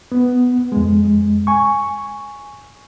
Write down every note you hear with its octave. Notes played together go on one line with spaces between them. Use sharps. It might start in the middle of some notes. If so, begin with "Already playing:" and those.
B3
F2 G#3
G#5 C#6